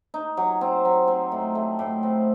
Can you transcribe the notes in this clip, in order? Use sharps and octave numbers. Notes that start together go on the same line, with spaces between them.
D#4
F#3
C4
F#3
C4
A2
A3
A2
C4